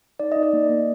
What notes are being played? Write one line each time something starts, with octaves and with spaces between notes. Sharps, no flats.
D#4 D5
D#4 D#5
D5
A#3
A#3